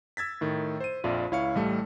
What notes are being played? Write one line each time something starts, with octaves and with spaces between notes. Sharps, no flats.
E6 G#6 A6 B6
A2 D#3
C5 D#7
A#1 F2 F4 D5 E5
C#2 E4 C#5 F5 C#6 C#7
A1 G3 A3